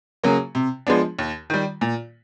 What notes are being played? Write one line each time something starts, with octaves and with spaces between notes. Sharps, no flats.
C#3 F#3 A#3 C#4
C3
F3 G#3 B3 D4
D#2
D#3 G3
A#2